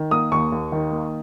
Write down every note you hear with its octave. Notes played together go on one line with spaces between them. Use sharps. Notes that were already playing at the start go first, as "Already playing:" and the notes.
Already playing: D#3
A#3 D#6
D#2 C#6
D#2
D#3
A#3